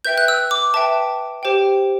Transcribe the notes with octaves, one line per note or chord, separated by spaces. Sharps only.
B4 E5 G5 G6
F#6
E6
D6
B4 E5 G5 A5
G4 C5 G5